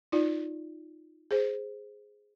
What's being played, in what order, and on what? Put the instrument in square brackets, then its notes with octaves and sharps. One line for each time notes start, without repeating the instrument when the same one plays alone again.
[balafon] D#4 F4 D5
G#4 C5